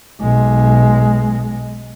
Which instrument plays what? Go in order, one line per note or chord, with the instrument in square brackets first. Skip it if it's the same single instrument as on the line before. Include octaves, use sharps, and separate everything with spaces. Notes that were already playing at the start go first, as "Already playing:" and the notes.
[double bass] B1 G#3